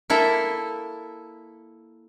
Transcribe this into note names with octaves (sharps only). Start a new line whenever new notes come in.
A#3 E4 A4